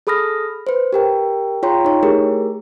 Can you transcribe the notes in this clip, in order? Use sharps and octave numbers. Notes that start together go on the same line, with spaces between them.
G#4 A4 B5 D#6 F6 A#6
B4 C5
G4 A#4 G5
F4 G#4 C#5 G5 A#5 C6
D#4 C#5
A3 E4 G4 G#4 A#4